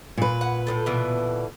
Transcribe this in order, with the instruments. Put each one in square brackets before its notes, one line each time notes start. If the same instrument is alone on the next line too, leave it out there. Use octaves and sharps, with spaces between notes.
[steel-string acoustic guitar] A#2 B4
[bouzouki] F#5
A2 E3 A4
B2 D3 E3